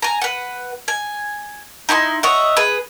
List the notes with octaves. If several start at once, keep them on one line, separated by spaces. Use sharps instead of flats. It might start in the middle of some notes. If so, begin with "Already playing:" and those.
G#5 A#5
B4 F#5
G#5
D#4 E4 G#5 C6
C#5 D#5 E5 F#5
G#4 B4